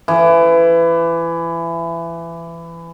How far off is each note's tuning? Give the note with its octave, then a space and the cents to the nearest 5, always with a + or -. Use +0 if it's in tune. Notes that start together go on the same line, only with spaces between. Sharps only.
E3 +25